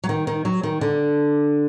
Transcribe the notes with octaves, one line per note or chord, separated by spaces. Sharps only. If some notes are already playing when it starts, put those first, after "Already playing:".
F#3
D#3
D#3
F#3
D#3
D3